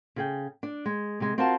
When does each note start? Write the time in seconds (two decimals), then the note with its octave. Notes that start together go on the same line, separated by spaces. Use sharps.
0.16 C#3 G#4 G5
0.63 D4
0.86 G#3
1.20 C3 G#3
1.38 C4 F4 F#4 A#4 F5 A5